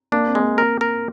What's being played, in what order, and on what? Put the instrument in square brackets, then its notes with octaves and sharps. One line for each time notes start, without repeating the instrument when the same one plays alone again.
[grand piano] A#3 [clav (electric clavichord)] D4
[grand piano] C4
[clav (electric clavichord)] G#3
[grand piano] A#3
[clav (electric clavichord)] A#4
A#4